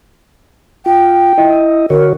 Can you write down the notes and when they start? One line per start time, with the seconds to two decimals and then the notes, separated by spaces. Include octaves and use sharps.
0.86 F4 G5
1.38 E4 D#5
1.90 D3 F#4 A#4 C#5